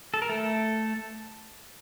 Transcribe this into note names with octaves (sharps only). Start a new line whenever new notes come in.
A4
A#4
A3 A4